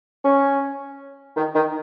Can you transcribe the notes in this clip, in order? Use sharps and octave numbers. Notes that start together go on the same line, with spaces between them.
C#4
D#3
D#3